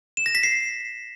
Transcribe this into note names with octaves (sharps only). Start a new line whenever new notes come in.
E7
A#6
B6
C7